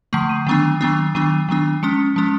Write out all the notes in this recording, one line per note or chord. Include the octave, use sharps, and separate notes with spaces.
D3 F3 A3 C7
D#7
D#3 F#3 B3 D4
D#3 F#3 B3 D4
D#3 F#3 B3 D4 D#7
D#3 F#3 B3 D4
F3 G#3 C#4 C#7
F3 G#3 C#4